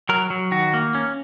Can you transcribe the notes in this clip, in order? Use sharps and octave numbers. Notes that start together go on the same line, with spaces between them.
F#3 A#4
F#3
D#3 F#4
A#3
C#4